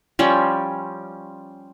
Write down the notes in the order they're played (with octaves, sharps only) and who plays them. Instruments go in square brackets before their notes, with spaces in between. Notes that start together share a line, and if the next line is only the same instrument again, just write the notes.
[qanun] F3 G3 C#4